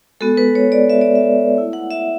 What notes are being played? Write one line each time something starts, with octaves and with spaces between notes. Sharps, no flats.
G#3 B3 F#4 A4
B4
C#5
D5
E5
D5
E5
A3 E4
F#5
E5